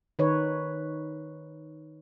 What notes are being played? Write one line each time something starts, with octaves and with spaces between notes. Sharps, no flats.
D#3 D#4 B4 C#5